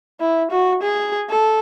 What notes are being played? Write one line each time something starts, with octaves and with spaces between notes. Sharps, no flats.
E4
F#4
G#4
A4